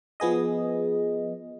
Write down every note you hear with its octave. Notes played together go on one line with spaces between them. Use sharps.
F3 B3 G#4 D#5